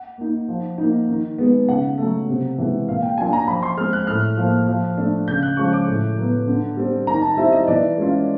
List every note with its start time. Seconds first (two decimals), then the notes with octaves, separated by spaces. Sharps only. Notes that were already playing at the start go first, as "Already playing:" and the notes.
Already playing: F#5
0.18 A#3 D#4
0.48 F3
0.78 A#3 D#4
1.09 D#3
1.38 G#3 B3
1.68 C#3 F#5
1.98 A3
2.03 F#3
2.28 C3
2.58 E3 G#3
2.88 A#2 F5
3.02 G5
3.18 F#3 A#3 D4 F4 G#5
3.33 A#5
3.48 F3 B5
3.63 C6
3.77 G#3 C4 F6
3.93 F#6
4.07 A2 F6
4.37 F3 A#3
4.67 F3
4.97 A3 D4
5.28 C#3 G6
5.43 F#6
5.57 F3 G#3 C#4 F4 C#6
5.73 D6
5.87 A2
6.17 F#3 B3
6.48 D3
6.77 G3 C4
7.07 D#3 A#5
7.22 A5
7.37 G3 C4 E4 E5
7.52 D#5
7.67 E3 D5
7.97 G#3 C#4 F4